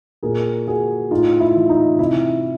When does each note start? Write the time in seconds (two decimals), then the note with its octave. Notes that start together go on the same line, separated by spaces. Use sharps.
0.23 A#2 G#4 A#4
0.67 F#4 G#4
1.10 A2 D#4 F4
1.40 E4
1.55 E3
1.69 D#4
1.99 C3 E4